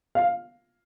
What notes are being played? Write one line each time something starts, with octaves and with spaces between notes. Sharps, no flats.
F5